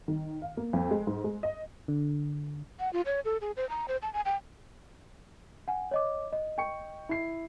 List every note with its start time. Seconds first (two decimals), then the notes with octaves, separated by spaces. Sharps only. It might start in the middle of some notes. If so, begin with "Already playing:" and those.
0.08 D#3
0.42 F5
0.57 A#3
0.73 F2
0.91 G#3
1.07 G#2
1.24 G#3
1.43 D#5
1.88 D3
2.80 F#5
2.93 F4
3.06 C#5
3.25 A4
3.41 G#4
3.57 C5
3.70 A#5
3.88 C5
4.02 A5
4.13 G#5
4.25 G5
5.68 F#5 G#5
5.91 C#5 D#5 D6
6.33 D#5
6.58 G5 C#6 C#7
7.09 E4 C7